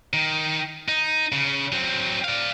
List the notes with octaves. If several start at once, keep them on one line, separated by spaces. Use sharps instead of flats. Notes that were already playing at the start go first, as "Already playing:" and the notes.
D#3
D#4
C#3
F#3 C4
D5 F5